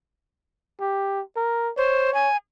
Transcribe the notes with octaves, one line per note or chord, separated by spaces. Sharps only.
G4
A#4
C5 C#5
G#5